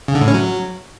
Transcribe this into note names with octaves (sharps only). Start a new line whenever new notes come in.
C#3
D3
A2
C#4
F#3